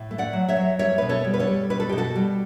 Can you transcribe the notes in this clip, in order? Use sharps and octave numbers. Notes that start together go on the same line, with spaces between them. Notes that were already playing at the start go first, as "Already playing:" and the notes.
Already playing: A2
A3
D5 F#5
F#3
C#5 E5
F#3
G3 C#5 E5
B2 B4
A4 C#5
G3
B4
A4 C#5
G3
B2 B4
A4
B2 G4
F#4 A4
G3